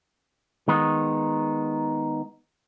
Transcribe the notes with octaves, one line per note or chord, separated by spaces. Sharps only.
D#3 G#3 B3 D#4